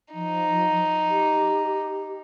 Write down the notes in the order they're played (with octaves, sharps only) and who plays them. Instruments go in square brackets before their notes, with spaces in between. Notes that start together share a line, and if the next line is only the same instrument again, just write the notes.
[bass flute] F3 [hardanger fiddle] D#4
[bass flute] G4